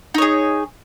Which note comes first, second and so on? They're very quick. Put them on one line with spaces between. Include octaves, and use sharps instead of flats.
D#4 C#5 G#4